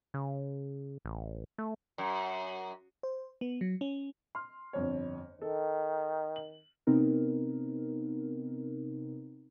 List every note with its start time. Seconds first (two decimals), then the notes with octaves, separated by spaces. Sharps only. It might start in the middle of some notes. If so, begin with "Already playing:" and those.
0.14 C#3
1.05 A1
1.58 A3
1.98 F#2
3.03 C5
3.41 B3
3.61 F#3
3.81 C#4
4.35 C6 F6
4.73 G1 F2 C#5
5.42 D#3 A4
6.36 F#7
6.87 C3 B3 C4 D#4 A#4